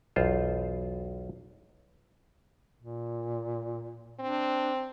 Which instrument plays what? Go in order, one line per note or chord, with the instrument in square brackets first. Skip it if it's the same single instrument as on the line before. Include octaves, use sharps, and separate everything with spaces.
[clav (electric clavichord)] B1 E2 F4 C5
[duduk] A#2
[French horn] C4 [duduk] D4